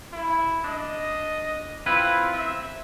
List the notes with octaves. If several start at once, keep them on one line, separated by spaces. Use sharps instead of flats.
E4
D4 D#5
C4 E4 F4 B4
E5